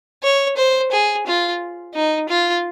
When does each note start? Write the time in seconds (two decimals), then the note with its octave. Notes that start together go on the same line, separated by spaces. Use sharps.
0.23 C#5
0.57 C5
0.91 G#4
1.26 F4
1.94 D#4
2.29 F4